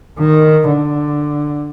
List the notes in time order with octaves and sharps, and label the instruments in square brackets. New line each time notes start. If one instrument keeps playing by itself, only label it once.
[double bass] D#3
D3